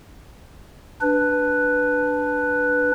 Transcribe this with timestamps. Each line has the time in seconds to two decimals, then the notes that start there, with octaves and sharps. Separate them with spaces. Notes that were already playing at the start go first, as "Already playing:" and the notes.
1.01 D4 B4